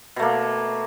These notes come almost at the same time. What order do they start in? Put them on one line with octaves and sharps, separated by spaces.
B2 A3 A#3